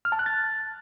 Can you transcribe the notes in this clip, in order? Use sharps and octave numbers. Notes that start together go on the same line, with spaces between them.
F6
A5
F#6
A6